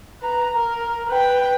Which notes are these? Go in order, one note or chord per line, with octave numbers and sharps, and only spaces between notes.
B4 A#5
A#4
B4 G5